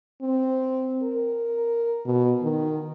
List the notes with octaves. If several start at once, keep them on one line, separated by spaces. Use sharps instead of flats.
C4
A#4
B2
D#3